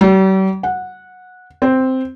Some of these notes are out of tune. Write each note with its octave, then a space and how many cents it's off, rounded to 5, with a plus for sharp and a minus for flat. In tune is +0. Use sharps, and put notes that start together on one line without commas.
G3 -45
F#5 -15
C4 -5